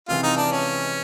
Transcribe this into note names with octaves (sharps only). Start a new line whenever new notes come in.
C#2 C3 E3 F4
D#4
D4
C#4